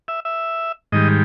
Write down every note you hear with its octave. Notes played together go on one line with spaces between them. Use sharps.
E5
E5
G#2 D#3 G3 D#5